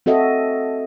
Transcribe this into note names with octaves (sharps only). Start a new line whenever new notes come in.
C4 F#4 A4 D#5 E5